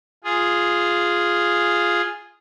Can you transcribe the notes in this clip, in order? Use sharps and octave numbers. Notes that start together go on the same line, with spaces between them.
F4 G#4